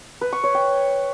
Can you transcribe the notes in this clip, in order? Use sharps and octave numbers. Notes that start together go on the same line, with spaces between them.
B4
C#6
C#5
G5